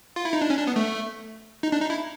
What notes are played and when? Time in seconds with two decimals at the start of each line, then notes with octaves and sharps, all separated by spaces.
0.16 F4
0.25 E4
0.33 D#4
0.41 D4
0.50 C#4
0.58 D4
0.67 B3
0.76 A3
1.63 D#4
1.72 D4
1.81 D#4
1.90 E4